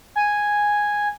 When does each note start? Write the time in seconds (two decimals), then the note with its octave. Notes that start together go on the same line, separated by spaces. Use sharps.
0.16 G#5